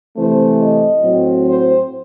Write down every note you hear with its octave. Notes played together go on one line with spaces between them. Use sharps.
C3 E3 A3 C4 C5
D#5
A2 F#3 C4
C5